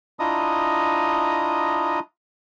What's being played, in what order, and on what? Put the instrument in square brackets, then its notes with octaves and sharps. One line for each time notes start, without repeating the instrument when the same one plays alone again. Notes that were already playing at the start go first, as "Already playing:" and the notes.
[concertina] D4 E4 F4 D#5 A#5 D#6